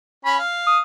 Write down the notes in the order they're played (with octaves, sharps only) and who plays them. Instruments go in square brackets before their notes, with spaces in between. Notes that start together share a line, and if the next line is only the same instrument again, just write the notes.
[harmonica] C#4 B5
F5
[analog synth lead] D#6